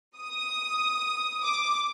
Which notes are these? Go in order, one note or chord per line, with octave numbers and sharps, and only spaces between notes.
D#6
D6